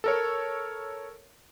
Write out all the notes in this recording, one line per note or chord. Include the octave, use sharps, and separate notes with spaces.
A4 A#4 C#5